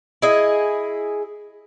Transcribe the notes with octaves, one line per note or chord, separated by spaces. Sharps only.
E4 G#4 D#5